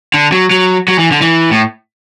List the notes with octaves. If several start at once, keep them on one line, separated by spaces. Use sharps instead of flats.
D3
F#3
F#3
F#3
E3
D3
E3
A2